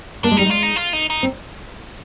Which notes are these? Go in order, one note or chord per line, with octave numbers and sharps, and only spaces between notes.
A#3 D4
G#3
G3 D#4
G#3 F4
D#4
F4
D#4
D#4
C4